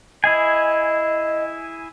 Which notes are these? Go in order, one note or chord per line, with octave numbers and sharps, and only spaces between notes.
E4 G#4 D#5 G#5